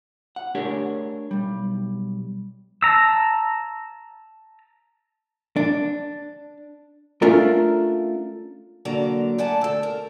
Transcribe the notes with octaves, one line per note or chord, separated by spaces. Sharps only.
F#5
A3 D4 G4 G#4 A#4 C#5
B1 G3
A5 A#5 E6
D4
A3 C#4 D4 F4 A#4
D3 F#3 A#3 D5 A#5
A3 D5 F#5 G#5 A5
D2 A4
A#4